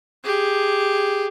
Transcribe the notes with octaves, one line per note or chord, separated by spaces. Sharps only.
G4 G#4